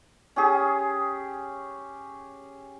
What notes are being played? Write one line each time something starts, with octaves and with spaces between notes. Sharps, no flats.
C#4 G4 G#4